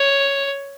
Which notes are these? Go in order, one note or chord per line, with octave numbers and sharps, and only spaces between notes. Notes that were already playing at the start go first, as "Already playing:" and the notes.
Already playing: C#5